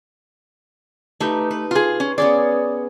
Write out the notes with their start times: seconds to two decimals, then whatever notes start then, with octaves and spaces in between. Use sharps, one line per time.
1.20 A3 D#4 G4 B4
1.51 B4
1.71 F4 G#4
2.00 C#4
2.18 B3 C#4 G#4 D5